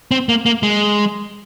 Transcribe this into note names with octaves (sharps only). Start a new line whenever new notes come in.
C4
A#3
A#3
G#3